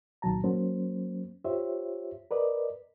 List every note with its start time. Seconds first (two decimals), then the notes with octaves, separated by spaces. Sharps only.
0.22 C2 A#2 D#3 F#3 A5 A#5
0.44 F#3 A#3 C#4 C5
1.44 F4 G4 C5 C#5 E5
2.31 A#4 B4 D5 D#5